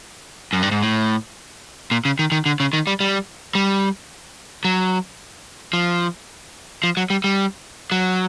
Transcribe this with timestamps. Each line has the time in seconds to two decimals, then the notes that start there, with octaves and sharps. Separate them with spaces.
0.53 F#2
0.63 G2
0.71 G#2
0.82 A2
1.91 A#2
2.05 C#3
2.19 D#3
2.32 D#3
2.46 D3
2.60 C#3
2.73 D#3
2.87 G3
3.00 G3
3.55 G3
4.65 F#3
5.73 F3
6.84 F3
6.97 F#3
7.10 G3
7.24 G3
7.92 F#3